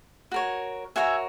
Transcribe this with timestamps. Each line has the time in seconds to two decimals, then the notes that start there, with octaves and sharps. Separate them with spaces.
0.32 F#4 A#4 C#5
0.96 F#4 A#4 C#5 E5 G#5